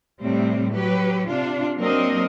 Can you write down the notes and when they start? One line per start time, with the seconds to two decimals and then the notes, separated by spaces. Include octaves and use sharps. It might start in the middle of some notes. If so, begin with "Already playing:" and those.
0.22 A2 C3 G3 C4
0.74 F#3 G4 B4
1.28 C3 D4 F4
1.77 F#3 A#3 C4 D4 A#4 D#5